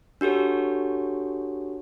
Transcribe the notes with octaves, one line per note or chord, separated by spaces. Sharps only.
D4 F#4 G4 A4 C#5